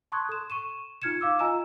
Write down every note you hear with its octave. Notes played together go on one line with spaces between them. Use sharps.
A5 C6 C#6 D#6 F#6 G#6
A4 E7
C#6 D#7 E7
D#4 F4 F6 G#6 C#7 E7
F5 D6 E6
F4 D#5 G#5 A#5 E6 E7